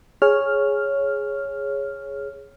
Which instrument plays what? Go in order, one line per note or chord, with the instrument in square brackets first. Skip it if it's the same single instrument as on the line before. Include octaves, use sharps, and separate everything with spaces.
[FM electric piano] G#4 C#5 F6